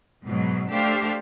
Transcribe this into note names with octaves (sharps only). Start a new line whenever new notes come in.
G#2 B2 F#3
A3 D4 G4 A4 C5 F5